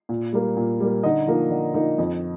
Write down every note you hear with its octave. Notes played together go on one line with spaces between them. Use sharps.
A#2
G3 A#3
A#2
G3 A#3
D3 D#4 D#5
F3 A#3 D#4
D3
F3 A#3 D#4
F2